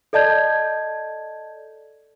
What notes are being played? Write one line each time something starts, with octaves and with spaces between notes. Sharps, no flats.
A4 D5 D#5 A5 G6 G#6